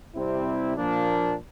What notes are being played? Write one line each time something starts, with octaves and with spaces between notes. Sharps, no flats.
C3 G3 C4 E4
A#2 F3 A#3 D4